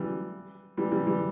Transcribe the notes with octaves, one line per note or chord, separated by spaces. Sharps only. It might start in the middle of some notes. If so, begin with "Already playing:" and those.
Already playing: E3 F#3 G3
E3 G3
E3 G3
E3 G3